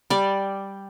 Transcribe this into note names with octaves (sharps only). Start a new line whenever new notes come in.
G3 D5